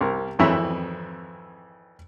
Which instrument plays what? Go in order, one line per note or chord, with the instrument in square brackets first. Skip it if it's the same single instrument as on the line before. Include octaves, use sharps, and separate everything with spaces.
[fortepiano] C2 C3 A#4
G#1 F2 E3 E4 C#5 A#5